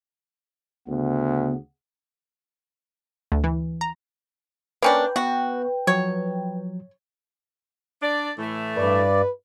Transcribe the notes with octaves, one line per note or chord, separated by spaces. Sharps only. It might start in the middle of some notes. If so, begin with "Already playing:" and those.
D2 C#3 B3
D2
E3
A#5
A#3 C#4 D4 B4 G5
B3 F#4
F3 F#3 C#5
D4 D5
A2 E3 A3
G2 B4 D5